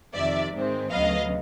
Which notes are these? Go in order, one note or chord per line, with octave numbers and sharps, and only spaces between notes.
F2 C3 D#3 D5 E5
G#2 D#3 G#3 C4
D2 C#3 F#3 B3 D#5 F5